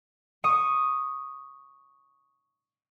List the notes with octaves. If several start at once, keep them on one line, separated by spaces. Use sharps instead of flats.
C#6 D#6